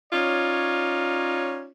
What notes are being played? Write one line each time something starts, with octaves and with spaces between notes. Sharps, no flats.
C#4 D#4 F4 C#5 D5